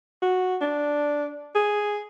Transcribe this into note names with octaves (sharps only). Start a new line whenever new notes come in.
F#4
D4
G#4